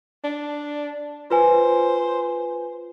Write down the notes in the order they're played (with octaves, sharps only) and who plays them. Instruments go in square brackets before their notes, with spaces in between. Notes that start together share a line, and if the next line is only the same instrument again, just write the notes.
[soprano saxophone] D4
[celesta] F4 B4 G#5 [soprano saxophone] C5